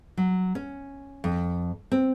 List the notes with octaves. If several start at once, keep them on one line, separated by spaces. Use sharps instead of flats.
F#3
C#4
F2
C4